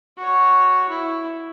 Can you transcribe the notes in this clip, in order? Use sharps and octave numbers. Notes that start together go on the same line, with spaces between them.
F#4 C#5
E4